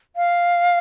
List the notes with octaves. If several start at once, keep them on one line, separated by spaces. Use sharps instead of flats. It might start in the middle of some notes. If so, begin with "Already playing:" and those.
F5